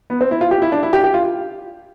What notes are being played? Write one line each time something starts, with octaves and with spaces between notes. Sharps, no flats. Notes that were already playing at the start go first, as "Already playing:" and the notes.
B3
C4
E4
F4
G4
E4
D4
E4
G4
G4
F4